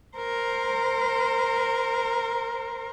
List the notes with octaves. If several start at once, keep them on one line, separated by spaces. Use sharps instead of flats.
A#4 C5